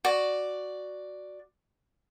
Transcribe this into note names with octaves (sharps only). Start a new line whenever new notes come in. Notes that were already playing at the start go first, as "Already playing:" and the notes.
F#4 D5